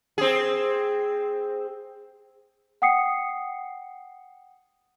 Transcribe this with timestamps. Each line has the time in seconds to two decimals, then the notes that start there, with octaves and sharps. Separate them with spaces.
0.18 C4 G#4
2.82 F#5 G5 D#6 C7 C#7